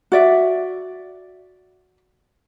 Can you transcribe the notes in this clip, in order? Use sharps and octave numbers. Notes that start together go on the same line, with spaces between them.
F#4 D5 E5